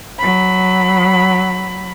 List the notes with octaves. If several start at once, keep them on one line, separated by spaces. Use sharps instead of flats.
F#3 B5